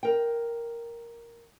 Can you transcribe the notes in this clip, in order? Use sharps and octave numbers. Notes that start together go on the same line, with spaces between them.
A#4 G5